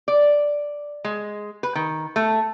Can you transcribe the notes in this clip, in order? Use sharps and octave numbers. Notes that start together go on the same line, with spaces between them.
D5
G#3
B4
D#3
A3